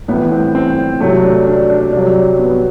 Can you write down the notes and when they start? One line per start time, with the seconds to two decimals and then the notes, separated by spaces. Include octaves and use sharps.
0.08 A2 E3 B3
0.32 C4
0.55 C4
1.00 C3 F#3 A3
1.24 D4
1.46 D4
1.70 D4
1.93 C3 F#3 D4
2.39 B3